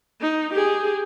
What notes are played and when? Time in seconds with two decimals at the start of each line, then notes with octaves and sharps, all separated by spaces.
0.21 D#4
0.54 G4 G#4